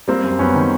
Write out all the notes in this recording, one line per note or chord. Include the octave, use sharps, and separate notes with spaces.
G3 A#3 C4
F#2
F#2 B3 C#4
D#3